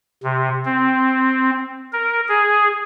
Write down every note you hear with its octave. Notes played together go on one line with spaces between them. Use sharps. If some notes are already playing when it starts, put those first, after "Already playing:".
C3
C4
A#4
G#4